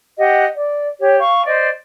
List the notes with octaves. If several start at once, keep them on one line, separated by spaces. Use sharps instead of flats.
G4 D#5 F#5
D5
G4 C#5
F5 C#6
C5 D5 D#5